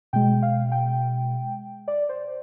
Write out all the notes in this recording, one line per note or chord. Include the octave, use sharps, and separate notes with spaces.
B2 G#3 G5
F5
G5
D5
C5